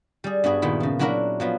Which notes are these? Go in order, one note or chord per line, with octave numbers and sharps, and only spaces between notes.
G3 G#4
G2 B3 F#4 G#4
A#2 D#3 B3 E4
C#3 F3
F#3 D4 E4 F#4 A#4 E5
F3 F#3 B3